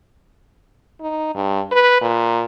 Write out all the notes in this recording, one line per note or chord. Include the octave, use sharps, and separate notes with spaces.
D#4
G2
B4
A#2